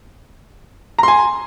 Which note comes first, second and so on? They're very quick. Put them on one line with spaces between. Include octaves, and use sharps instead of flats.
A#5 C6 G#5